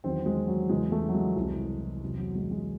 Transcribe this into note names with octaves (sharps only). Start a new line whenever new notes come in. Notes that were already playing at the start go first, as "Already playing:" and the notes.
E2 D#3 F#3 C4
G#3
F#3
E2 C#3 E3 G#3
A3
F#3
G#3
C2 C3 E3
E2 C3 F#3
F#3
G#3
G#3